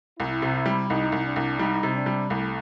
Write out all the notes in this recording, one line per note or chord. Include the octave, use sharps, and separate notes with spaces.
C2 E4
C3
E4
G3
C2 D#4
C2
D4
C2
G3 D#4
C3
D4
G3
C2 A3